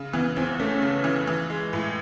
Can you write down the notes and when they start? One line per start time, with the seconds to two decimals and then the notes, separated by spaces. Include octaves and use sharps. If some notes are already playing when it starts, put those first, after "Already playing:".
Already playing: C#3
0.14 E3 B3
0.37 E2 C4
0.59 A3 C#4
0.82 C#3
1.04 E3
1.27 E3
1.50 G#3
1.73 A2